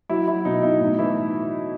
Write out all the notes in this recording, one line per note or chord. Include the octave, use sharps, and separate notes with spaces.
F#3 E4
F#3 E4
B2 D#4
B2 E4
A2 D#4
E3 E4